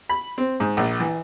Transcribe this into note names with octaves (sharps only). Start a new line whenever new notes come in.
B5
C4
G#2
A#1
E3